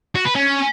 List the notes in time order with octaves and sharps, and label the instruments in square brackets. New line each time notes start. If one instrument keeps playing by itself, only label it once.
[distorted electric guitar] F#4
B4
C#4